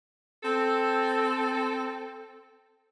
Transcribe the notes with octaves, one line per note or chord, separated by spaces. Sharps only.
C4 A4